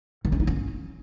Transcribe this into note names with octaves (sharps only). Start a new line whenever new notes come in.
D#3
C#4
D#4
C#4